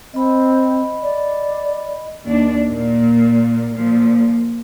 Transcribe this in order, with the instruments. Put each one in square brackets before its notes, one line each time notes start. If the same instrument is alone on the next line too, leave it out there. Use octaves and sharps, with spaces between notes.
[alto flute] C4 [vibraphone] D#5 B5
[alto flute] D5
[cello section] D#2 D4
A#2
A#2 F3